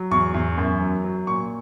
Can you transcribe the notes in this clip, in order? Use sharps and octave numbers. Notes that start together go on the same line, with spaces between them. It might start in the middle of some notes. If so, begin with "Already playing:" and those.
Already playing: F#3
E2 C#6
E2
F#2
F#3
F#3
A#2 C#6